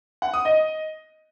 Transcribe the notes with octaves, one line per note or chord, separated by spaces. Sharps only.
F#5
D#6
D#5